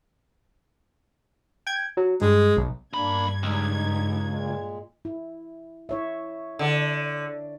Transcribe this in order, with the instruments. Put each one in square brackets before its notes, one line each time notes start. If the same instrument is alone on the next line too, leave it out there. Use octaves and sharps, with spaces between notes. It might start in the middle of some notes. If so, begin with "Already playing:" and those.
[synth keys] G5 G#6
F#3
[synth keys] G2 [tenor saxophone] G#3
[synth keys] B1
[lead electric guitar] B1 B5 [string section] G2 G#6 [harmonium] A#3 D4
[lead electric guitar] C#2 [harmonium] D#4
[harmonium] A#2 G#3
[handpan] E4
E4 C#5 E5
[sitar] D3